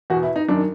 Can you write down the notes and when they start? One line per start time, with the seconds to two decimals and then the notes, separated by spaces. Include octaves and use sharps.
0.10 E2 B2 F#4
0.23 E4
0.36 D#4
0.48 F#2 D#3 D4